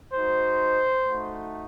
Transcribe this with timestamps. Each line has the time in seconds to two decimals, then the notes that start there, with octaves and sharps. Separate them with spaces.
0.12 G#3 D#4 F#4 C5
1.04 A3 D#4 F#4